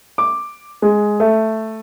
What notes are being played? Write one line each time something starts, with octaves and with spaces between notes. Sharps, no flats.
D6
G#3
A3